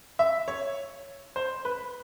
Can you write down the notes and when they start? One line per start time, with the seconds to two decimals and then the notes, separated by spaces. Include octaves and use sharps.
0.19 E5
0.48 C#5
1.36 C5
1.65 B4